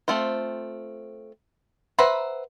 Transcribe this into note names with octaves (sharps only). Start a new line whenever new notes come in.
A3 C4 F4 C5
B4 C5 E5 F#5 A#5